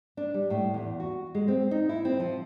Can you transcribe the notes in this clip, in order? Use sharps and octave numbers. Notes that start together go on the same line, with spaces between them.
D4
G3
A2
E2
F#4
G#3
C4
D#4
E4
C4
F3